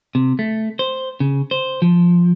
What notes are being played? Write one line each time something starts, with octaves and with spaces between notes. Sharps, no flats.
C3
A3
C5
C#3
C5
F3